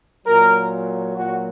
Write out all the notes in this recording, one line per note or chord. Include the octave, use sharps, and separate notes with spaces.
A#2 F#3 A#4
A#2 F#3 F#4